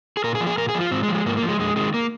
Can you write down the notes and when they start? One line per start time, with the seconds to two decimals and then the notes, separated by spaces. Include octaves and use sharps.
0.17 G#4
0.24 A#2 A#4
0.35 G#4
0.41 F3
0.47 G#4
0.58 A#2 A#4
0.69 G#4
0.75 F3
0.81 F4
0.91 G#2 C4
1.03 G#3
1.09 F3
1.14 G#3
1.26 G#2 A#3
1.37 A#3
1.43 F3
1.49 G#3
1.59 F2 G#3
1.76 C3 D#3 G#3
1.94 A#3